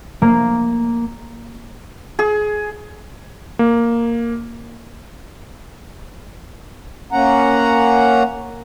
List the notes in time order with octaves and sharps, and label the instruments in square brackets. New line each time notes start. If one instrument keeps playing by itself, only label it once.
[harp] A#3
[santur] G#4
[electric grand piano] A#3
[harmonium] A#3 C#4 F#5 A#5